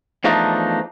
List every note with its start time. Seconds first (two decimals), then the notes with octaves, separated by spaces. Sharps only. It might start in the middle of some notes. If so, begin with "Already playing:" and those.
0.24 E2 F3 A3 D4 D#4